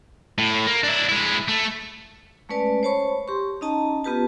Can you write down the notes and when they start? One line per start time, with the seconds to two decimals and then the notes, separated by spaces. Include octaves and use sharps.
0.38 A2
0.67 A#3
0.84 D4 E4
1.09 G#3 E4
1.48 A3
2.49 G#3 A3 C#4 B4 D5 A5
2.83 C5 C#5 A5 B5 C#6
3.28 G4 C6 C#6
3.61 C#4 D#4 D#5 A5 A#5
4.04 B3 F4 G4 B4 A5